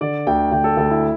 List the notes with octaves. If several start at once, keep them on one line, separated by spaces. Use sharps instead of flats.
D3 D5
D2 G5
D2 G5
A4
D2 A4
E4